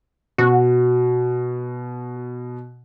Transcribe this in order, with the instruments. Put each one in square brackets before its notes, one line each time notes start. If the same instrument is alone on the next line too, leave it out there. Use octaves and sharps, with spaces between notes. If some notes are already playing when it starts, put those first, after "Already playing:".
[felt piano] B2 [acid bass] F#4